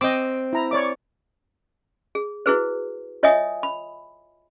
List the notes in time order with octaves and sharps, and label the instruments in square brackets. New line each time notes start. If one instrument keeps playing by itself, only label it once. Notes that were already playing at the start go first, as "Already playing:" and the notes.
[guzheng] C4 G5 [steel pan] D#5 D6
[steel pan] E4 A#5
C#5 D5 D6
[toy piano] G#4
E4 F#4 G#4 B4 C5
F4 C#5 D#5 E5 G#5 D#6
B5